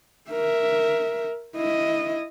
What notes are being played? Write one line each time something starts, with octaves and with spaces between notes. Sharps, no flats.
A#4 E5
E4 D#5